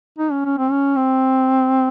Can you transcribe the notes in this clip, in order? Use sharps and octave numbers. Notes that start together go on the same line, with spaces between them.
D#4
C#4
C#4
C4
C#4
C4